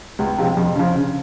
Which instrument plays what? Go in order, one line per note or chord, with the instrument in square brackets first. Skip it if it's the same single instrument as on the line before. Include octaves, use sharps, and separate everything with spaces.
[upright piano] C#2
C3 F3 G#3
F2
C#3 F3
C#3